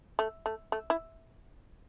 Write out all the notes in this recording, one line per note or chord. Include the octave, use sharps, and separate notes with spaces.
A3
A3
A3
E4